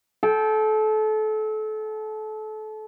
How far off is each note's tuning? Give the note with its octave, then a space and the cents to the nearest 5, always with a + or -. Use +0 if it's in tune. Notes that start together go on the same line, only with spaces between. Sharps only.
A4 -30 G5 +0